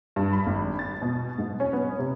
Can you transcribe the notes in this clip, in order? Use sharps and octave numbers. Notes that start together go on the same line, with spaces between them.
G2
B5
G#1
A6
B2
G#2
C#4
B3
C3